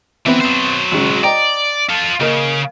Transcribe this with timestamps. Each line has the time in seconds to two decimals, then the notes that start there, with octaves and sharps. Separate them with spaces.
0.26 E3 B3 C4 E5
0.40 F#3 C5
0.92 G#1 C#3
1.23 D5 D#5 G5 A#5
1.89 F4 A4
2.21 C#3 A#3 D#5